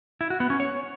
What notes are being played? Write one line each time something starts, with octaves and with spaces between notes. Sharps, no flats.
E4
F#4
B3
C#4
C#5